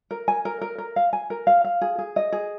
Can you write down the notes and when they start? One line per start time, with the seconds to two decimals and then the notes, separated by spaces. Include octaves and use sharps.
0.11 A#4
0.28 G#5
0.45 A#4
0.61 A#4
0.78 A#4
0.96 F5
1.13 G#5
1.30 A#4
1.47 F5
1.64 F5
1.81 G#4
1.98 G#4
2.16 D#5
2.32 G#4